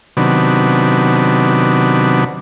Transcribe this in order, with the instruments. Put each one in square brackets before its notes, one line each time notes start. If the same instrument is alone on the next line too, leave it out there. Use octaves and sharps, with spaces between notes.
[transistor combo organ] C3 D#3 F#3 B3 D4